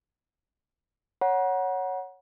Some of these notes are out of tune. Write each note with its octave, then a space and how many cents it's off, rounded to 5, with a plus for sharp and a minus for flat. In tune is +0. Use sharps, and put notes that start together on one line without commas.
C#5 +0 F#5 +0 A#5 +40